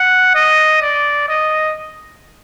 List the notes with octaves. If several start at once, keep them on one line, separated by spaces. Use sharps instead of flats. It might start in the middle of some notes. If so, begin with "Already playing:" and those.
Already playing: F#5
D#5
D5
D#5